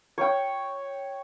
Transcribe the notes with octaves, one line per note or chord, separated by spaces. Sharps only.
C#5 G5